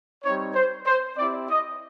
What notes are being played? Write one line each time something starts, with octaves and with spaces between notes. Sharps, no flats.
G3 C4 D#4 C#5
C5
C5
C4 E4 G4 D5
D#5